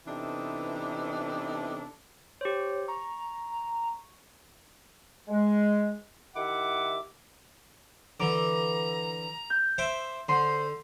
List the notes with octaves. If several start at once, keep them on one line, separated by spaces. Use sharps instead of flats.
C3 E3 B3 D4 D#4 A4
G4 C5 C#5
A#5 C#6
G#3
D#3 E4 G4 E5 F#5 D6
D3 E3 A#5 D6
G6
C5 E5 D6
D3 C5 C6